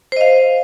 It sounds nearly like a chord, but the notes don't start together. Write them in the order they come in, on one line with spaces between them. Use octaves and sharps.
C5 D#5 F5